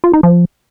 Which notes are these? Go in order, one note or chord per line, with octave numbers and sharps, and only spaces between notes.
F4
D#4
F3